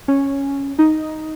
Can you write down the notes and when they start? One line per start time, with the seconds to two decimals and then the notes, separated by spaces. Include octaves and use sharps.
0.08 C#4
0.79 D#4